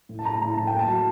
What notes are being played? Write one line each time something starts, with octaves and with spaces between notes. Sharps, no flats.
A2
A5
A2 A#5
A2 A#5
A2 A5
G5
A#3
A5
F#3
A5